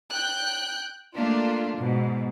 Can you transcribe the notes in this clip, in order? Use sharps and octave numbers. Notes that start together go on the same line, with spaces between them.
G5 F#6 G6
A3 A#3 D4 F4
G#2 B2